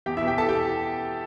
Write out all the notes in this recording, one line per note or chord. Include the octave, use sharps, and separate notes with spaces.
E2 G4 G5
E4 E5
B2
G4 G5
B2 A4 A5
G4 G5